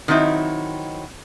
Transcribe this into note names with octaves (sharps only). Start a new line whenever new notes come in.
D#3 F#3 C4 D#4 E4